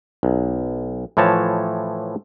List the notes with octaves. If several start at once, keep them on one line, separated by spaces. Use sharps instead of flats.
B1
A2 E3 F3 C#5 A5